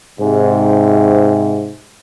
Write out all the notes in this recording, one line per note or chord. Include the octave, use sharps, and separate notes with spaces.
G#2 C3